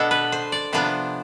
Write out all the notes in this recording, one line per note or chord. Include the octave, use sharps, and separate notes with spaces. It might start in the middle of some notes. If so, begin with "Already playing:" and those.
Already playing: B2 B3 D4 A4
B4
C5
D5
C3 F3 B3 D4 C5